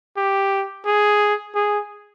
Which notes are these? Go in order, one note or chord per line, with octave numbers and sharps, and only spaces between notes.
G4
G#4
G#4